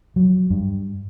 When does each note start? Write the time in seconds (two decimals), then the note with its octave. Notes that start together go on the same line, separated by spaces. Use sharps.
0.16 F#3
0.50 G2